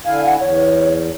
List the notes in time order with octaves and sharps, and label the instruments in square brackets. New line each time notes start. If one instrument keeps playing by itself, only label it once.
[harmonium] D3 E4 G#5 [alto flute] F5
[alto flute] F#5
[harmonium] E2 [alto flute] C#5